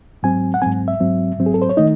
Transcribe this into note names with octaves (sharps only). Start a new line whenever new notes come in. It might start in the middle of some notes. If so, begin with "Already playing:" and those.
G#2 F#3 C4 G#5
F#5
G#2 F#3 C4 G#5
E5
G#2 F#3 C4
G#2 F#3 C4
G#4
A4
C5
C#5
D#3 A3 D#4 D#5